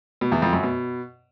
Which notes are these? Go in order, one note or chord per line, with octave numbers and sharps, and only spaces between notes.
B2
E2
F2
F#2
B2